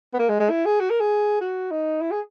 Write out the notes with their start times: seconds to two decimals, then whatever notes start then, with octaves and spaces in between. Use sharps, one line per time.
0.14 B3
0.19 A#3
0.29 G#3
0.40 G#3
0.50 E4
0.65 G#4
0.80 F#4
0.90 A#4
1.00 G#4
1.41 F#4
1.71 D#4
2.01 E4
2.11 G#4